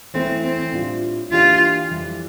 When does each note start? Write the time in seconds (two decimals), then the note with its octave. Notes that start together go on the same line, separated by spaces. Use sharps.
0.14 E3 A3 C4 E4
0.43 C4
0.73 A2 G3 D4 F4
1.32 E3 A#3 D4 F4 G4
1.91 F2 E3 G3